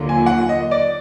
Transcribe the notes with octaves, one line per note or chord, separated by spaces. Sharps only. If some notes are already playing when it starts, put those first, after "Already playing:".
Already playing: D#2 D3 F#3 A#3 F4
G#5
F#5
D#5
D5